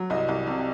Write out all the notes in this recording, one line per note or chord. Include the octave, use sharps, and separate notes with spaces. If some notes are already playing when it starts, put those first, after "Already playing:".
Already playing: F#3
C2 D#5
C2
C3